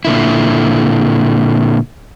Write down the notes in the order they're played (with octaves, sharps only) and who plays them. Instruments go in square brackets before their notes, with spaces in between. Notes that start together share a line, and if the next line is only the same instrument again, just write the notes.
[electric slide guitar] A#2 D3 E4